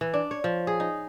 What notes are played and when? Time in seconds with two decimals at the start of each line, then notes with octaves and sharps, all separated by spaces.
0.01 E3
0.14 D4
0.31 C#5
0.44 F3
0.67 G#4
0.80 D#4